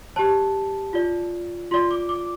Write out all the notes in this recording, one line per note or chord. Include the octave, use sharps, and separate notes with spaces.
G4 C5 A5
F4 D5
F4 D5 C6
D6
D6